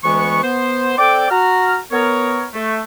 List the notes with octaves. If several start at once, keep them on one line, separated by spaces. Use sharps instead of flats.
D2 E3 G#3 B3 C#6
B3 C5
C4 A4 D5 G5 D6
F#4 A#5 F6
B3 A#4 C#5
A3